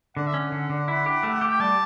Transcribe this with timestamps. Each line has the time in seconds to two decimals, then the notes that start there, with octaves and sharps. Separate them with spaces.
0.16 D3 F#5
0.27 E5
0.34 C#4
0.39 F#5
0.52 D3
0.70 D3
0.88 E4
1.06 G4
1.23 A3
1.41 G4
1.49 G5
1.60 G3 A5